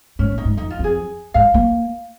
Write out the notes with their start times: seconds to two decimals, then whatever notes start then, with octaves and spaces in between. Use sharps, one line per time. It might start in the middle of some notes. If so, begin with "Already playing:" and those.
0.19 G#2 C#4
0.32 A#2
0.38 D#4
0.45 G#2
0.57 F2 D#4
0.70 F4
0.79 F2 G#4
1.34 G#2 F5
1.54 A#3